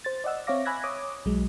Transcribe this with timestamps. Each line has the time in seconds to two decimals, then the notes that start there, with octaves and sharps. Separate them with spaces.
0.04 C5 A6
0.24 D5 D#5 F#5 E6
0.47 C4 C#5 E5 F5 D6 A#6
0.65 G#5 B5 E6 F#6 G#6 A#6
0.84 C#5 D6 D#6
1.25 B1 F#3 G#3